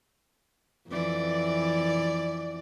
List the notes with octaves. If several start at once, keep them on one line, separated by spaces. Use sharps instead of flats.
F2 E3 D5